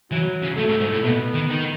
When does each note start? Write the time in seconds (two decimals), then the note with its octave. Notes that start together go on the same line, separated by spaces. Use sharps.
0.11 E3 F#3
0.42 C#3
0.57 A2 A3
0.69 G#2
0.81 G#2
0.92 A2
1.04 B2 B3
1.34 D#3
1.49 D#3